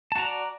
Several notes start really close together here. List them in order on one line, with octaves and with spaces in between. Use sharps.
A5 F#4 A#5 D5